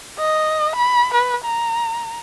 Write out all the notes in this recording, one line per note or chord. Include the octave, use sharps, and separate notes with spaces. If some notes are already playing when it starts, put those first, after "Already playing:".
D#5
B5
B4
A#5